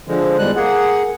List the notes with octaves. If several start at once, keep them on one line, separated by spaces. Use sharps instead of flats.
D3 F3 G#3
E2 G3 G#3 F#6
A#3 G#4 F#5